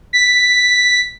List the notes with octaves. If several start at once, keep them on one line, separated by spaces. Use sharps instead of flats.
B6